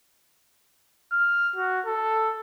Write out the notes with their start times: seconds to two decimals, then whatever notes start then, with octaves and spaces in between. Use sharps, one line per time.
1.12 F6
1.56 F#4
1.86 A4